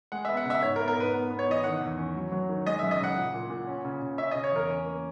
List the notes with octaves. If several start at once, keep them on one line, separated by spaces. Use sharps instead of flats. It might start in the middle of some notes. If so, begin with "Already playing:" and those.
G#3 F#5
E5
B3
F#5
C#3 E5
G#2 C#5
A#4
B3
A#4
G#2 B4
B3
B3
C#5
E3 D#5
D#3 F#5
E2
C#4
F#3
F#3
D#3
G#3 D#5
E5
F#2
D#5
C#3 F#5
A#2
A#2
A#2
C#4
C#3
C#3
C#4 E5
D#5
C#3
C#5
E2 A#4
C#4
A#3